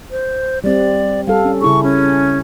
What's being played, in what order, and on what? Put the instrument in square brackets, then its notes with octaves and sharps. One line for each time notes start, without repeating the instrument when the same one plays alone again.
[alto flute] C5
[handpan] G3 C4 [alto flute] D5
[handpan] G3 A4 [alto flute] F5
[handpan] C#4
[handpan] C#3 E4 G#4 [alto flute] C#6
[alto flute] C#4